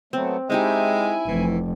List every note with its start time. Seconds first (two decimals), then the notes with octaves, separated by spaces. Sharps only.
0.13 F#3 A3 B3 C4
0.50 G#3 C4 D#4 E4 G4 E5 G#5
1.28 F1 E3